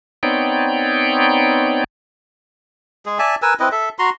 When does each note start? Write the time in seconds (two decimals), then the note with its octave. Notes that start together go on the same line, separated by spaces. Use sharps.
0.23 B3 C4 D#4 C#5 D5 G5
3.06 G#3 G#4
3.19 D5 E5 G#5 A5
3.42 A#4 B4 G#5 E6
3.60 C4 E4 B4 D#5
3.72 A4 E5
3.99 F#4 A#5 C6